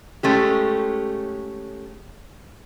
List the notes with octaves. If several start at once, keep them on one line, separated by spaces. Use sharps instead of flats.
G#3 A3 C#4 G4